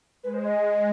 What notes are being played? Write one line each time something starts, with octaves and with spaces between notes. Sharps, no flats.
G#3 B4
C5
D#5